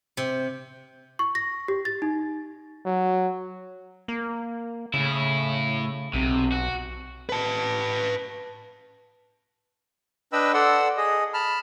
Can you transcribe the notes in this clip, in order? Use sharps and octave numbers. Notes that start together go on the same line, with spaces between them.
C3
C#6
A#6
G4
A6
D#4
F#3
A#3
A2 C#3 E4
B1 C3
F#4
B4 A5
D4 B4 D#5 G5 B5 E6
A4 D5 F#5 C6 E6
G#4 D#5
A5 B5 F6